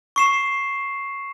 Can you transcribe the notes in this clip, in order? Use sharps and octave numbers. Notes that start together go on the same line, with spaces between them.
C#6 C7 E7